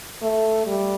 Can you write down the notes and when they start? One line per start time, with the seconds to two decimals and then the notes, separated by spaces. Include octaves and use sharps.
0.22 A3
0.67 G3